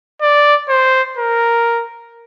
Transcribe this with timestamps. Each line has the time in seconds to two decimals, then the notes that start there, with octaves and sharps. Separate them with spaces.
0.21 D5
0.69 C5
1.17 A#4